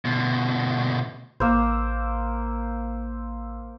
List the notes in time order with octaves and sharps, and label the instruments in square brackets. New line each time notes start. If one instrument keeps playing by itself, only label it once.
[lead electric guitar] D2 B2
[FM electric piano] A1 E6 [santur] A#3 C5